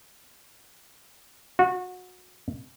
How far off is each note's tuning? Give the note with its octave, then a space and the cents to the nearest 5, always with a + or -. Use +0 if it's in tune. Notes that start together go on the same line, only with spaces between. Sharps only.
F#4 -25